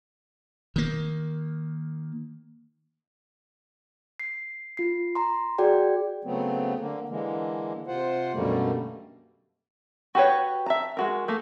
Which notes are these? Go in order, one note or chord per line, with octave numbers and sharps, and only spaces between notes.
D#3 A#3
C7
F4 C7
A#5 C6
F#4 G#4 D5 G5
C#3 F#3 A3 B3 C4
D3 A#3
D3 E3 G#3 A#3
C3 F4 C5 F#5
F#2 B2 D3 G3 A3 A#3
F#4 G4 B4 C#5
E5 A5 A#5
G#3 F#4 A#4
A3 A#3